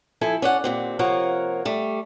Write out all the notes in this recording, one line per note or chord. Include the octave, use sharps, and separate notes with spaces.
F3 E4 A4 G#5
C#4 D5 F#5
D#2 A#2 C4
C3 F3 A#3 A#4 C#5 F#5
G3 A3